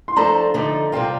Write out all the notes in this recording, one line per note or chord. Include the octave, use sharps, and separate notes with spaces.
C6
F3 A3 D4 A4 C5 A#5
D3 F3 A3 D#4
C3 G3 C4 F4